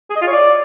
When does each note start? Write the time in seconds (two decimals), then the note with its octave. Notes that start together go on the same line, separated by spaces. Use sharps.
0.10 G#4
0.16 D#5
0.21 F4
0.27 C#5
0.33 D5